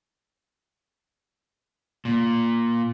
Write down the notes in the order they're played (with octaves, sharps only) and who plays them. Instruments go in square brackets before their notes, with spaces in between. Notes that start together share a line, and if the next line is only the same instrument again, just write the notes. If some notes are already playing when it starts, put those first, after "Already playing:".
[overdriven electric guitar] A#2